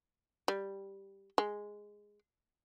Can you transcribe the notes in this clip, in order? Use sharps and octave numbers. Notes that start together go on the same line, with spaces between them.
G3
G#3